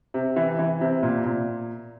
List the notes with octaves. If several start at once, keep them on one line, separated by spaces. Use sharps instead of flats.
C3
E3
E3
C3
A#2
A#2